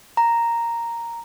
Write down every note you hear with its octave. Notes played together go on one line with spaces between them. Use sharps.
A#5